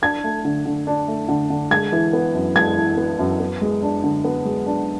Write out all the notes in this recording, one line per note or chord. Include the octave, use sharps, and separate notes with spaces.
D4 G#6
A3
D3
D3
D4
A3
D3
D3
G#3 G#6
E3
B3
F#2
G#3 G#6
E3
B3
F#2
B3
G#3
D4
D3
B3
G#3
D4